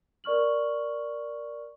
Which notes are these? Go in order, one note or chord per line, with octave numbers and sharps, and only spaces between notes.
A#4 D5 C#6 F6 F#7